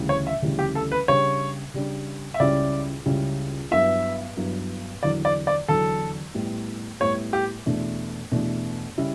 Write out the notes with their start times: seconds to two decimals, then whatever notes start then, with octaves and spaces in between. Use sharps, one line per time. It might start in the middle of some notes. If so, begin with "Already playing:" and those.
Already playing: D2 C#3 E3 G3 C#4
0.09 C#5
0.27 E5
0.42 D2 C#3 E3 G3 C#4
0.59 G4
0.75 A4
0.92 B4
1.08 C#3 G3 D4 C#5
1.74 C#3 G3 D4
2.34 E5
2.40 C#2 C#3 G3 C#4 E4 D5
3.06 C#2 C#3 G3 C#4 E4
3.71 G2 F#3 B3 E4 E5
4.37 G2 F#3 B3 E4
5.03 E2 D3 F#3 D5
5.25 D5
5.47 D5
5.68 E2 D3 F#3 A4
6.34 A2 G3 B3
7.00 A2 G3 B3 C#5
7.33 G4
7.66 E2 B2 A3 D4
8.31 E2 B2 A3 D4
8.98 C#3 G3 C#4 E4